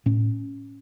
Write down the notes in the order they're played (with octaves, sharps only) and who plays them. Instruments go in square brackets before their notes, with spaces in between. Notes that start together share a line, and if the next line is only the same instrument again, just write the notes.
[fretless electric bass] A2 C#4